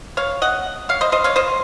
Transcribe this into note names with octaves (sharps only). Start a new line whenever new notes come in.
C#5 F5
D#5 F#5
C#5 F5
C5 D#5
C5 D#5
C#5 F5
C5 D#5